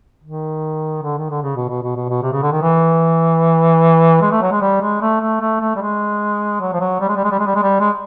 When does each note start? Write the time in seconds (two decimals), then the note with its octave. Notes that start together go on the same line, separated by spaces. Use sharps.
0.23 D#3
1.02 D3
1.18 D#3
1.30 D3
1.43 C#3
1.56 B2
1.69 B2
1.83 B2
1.96 B2
2.09 B2
2.22 C3
2.32 C#3
2.42 D3
2.52 D#3
2.62 E3
4.22 G#3
4.32 A3
4.42 F#3
4.52 G#3
4.61 G3
4.82 G#3
5.02 A3
5.21 A3
5.41 A3
5.61 A3
5.76 G3
5.81 G#3
6.61 F#3
6.73 F3
6.80 F#3
7.01 G3
7.08 G#3
7.17 G3
7.24 G#3
7.31 G3
7.40 G#3
7.47 G3
7.55 G#3
7.62 G3
7.80 G#3